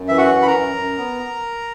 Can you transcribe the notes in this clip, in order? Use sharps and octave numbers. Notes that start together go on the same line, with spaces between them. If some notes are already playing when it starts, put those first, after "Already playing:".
Already playing: F#2
E3 E5
F#4 F#5
F#2
B5
A#4 A#5
F#2
F#2
B3